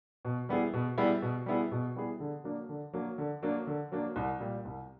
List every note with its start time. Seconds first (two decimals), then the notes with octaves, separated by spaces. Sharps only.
0.25 B2
0.49 G3 B3 E4 G#4
0.73 B2
0.98 G3 B3 E4 G#4
1.22 B2
1.46 G3 B3 E4 G#4
1.72 B2
1.96 G3 B3 E4 G#4
2.20 D3
2.44 F#3 A#3 D4
2.69 D3
2.93 F#3 A#3 D4
3.18 D3
3.42 F#3 A#3 D4
3.67 D3
3.92 F#3 A#3 D4
4.16 C2
4.40 A#2 G3
4.65 C2